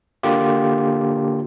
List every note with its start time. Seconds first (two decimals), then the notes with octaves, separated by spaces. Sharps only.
0.23 D3 A#3 F4 G4